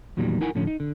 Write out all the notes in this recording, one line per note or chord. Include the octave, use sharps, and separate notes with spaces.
E2 A#2 D#3 F#3 G3
D#4 E4 A#4 F#5 G#5
A2 D3 F3 C#4
D#4
D3